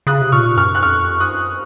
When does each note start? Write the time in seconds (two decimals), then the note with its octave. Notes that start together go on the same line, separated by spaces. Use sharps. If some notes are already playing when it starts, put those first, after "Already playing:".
0.07 C#3 D#6 F#6
0.21 C3
0.32 A#2 C#6 F6
0.57 F#2 C#6 F6
0.75 F#6
0.83 F2 C#6 F6
1.20 F#2 D#6 F#6